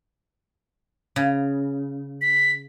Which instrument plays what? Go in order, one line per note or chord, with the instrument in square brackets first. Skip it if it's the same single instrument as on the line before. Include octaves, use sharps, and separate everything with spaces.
[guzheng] C#3
[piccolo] B6